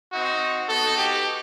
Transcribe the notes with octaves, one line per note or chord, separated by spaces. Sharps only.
C4 D#4 F#4
B3 D#4 F#4 A4
G4